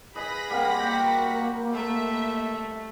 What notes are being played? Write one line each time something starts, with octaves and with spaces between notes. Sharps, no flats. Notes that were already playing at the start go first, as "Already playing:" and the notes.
G#4 B4 D#5 F5 B5 A#6 B6
G3 A#3 C4 F#5
A#3 F#4 G5
A3 E5